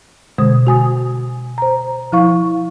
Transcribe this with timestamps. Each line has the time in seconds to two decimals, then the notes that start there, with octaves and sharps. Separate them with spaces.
0.38 B2 D3 G#3 C5 D#6
0.67 F#4 G#5 D#6
1.58 C5 A#5
2.12 F3 E4 F5 C#6